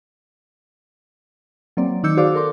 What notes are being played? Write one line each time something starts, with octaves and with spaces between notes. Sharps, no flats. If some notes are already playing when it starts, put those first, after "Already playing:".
F#3 A#3 C4 D5
D#3 D#4 D6 E6 G6 C#7
F#4 G#4 C5 D5 F5 D6
A4 A#4 C6 D6